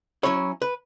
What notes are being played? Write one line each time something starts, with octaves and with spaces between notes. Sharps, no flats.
F#3 C#4 E4 C#5
B4